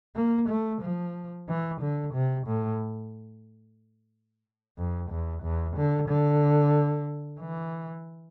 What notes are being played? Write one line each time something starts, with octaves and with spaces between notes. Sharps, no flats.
A#3
A3
F3
E3
D3
C3
A2
F2
E2
E2
D3
D3
E3